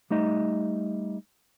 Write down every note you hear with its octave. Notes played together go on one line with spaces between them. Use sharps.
G3 A3 D#4 D#5